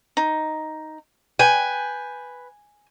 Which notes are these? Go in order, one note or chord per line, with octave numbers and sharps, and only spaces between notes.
D#4
B4 G5 G#5